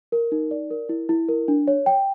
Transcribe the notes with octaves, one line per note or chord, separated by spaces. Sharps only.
A#4
D#4
D5
A#4
E4
E4
A#4
D4
C#5
G5